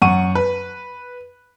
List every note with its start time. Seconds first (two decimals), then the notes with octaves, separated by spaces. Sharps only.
0.02 F#2 F#5 C#6 D#7
0.35 B4